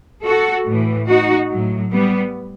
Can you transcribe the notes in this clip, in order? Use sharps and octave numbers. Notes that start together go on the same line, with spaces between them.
F#4 A4
A2 E3
D#4 F#4
A2 F#3
G3 B3